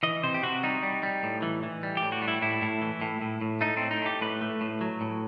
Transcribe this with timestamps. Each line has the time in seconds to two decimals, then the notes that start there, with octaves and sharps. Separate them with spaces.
0.03 E3 D#5
0.23 C3 C5
0.34 G4
0.43 C3 F#4
0.63 G3 D#4
0.83 G3
1.03 G3
1.23 A2
1.42 E3
1.63 E3
1.83 G3
1.97 A2 G4
2.12 F#4
2.22 G3
2.28 E4
2.42 A2 E4
2.62 A2
2.82 E3
3.02 A2
3.22 A2
3.41 A2
3.61 A3 D#4
3.77 A2 C4
3.91 D#4
4.02 A3 G4
4.21 A2 B4
4.41 A3
4.61 A2
4.81 F#3
5.01 A2